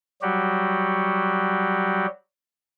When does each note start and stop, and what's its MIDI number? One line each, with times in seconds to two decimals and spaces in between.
0.22 2.06 54
0.22 2.06 55
0.22 2.06 66
0.22 2.06 67